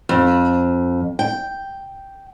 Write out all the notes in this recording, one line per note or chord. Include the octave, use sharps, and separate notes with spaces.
F2
G5